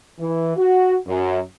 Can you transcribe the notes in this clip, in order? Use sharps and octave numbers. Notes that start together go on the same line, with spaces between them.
E3
F#4
F#2